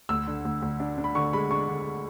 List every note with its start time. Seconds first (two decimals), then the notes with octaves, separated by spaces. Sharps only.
0.09 D2 E6
0.28 D3
0.45 D2
0.62 D2
0.80 D4
0.98 D4
1.04 B5
1.15 D3 C#6
1.33 G#3 B5
1.51 D4 C#6
1.68 D3